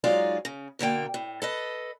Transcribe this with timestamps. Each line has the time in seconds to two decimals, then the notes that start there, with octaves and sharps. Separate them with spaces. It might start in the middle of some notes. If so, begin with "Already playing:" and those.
0.04 F#3 G#3 D#4 F4 D5 F5
0.45 C#3
0.79 B2 D3 A#3 G5
1.14 A2
1.42 A4 B4 D#5